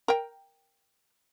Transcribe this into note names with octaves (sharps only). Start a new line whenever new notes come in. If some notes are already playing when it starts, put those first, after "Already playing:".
A#4 G5